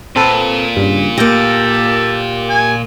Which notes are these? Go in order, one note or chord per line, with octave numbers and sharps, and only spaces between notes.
A#2 C4 A4 B4
G2 C#3
A#3 G4 A4 D6 G6 A#6
G#5